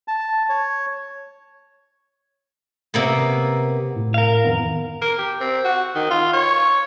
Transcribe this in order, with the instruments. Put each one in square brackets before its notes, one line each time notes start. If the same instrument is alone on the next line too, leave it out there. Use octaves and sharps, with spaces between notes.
[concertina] A5
C#5
[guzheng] C3 A#3 B3
[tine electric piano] A2
[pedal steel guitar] A#4 F5
[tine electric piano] F2 D#3 B3
[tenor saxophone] A#4
G4
C4
F#4
D#3
F4
C#5